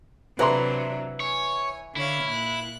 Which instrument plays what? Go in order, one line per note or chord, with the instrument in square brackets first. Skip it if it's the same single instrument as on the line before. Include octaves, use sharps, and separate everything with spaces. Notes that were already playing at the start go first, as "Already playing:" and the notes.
[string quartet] C3 F#3 D4 [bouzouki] E3 [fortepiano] B4 A#5 C6
[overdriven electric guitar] C#5 [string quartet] G#5
[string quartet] D3 C#5 F5 [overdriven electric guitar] E4
[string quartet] A#2 F#6